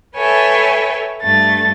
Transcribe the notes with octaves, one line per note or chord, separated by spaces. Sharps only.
A4 B4 C#5 E5 G5 G#5
G2 A3 A6